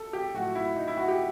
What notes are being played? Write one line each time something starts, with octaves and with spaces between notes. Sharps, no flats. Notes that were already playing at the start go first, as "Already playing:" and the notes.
Already playing: A4
G4
A2 F#3 A3 F#4
E4
D#4
E4
F#4
G4